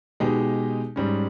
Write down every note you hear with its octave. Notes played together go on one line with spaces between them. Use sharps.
B2 G#3 D#4 G4
G#2 G3 C#4